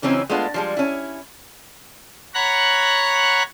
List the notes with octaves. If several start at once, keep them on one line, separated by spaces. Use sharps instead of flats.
C#3 E3 F#3 C4 C#4 D#4
G#3 A3 B3 D4 F4
F3 G3 G#3
C#4 E4
C#5 F#5 A#5 B5 F#6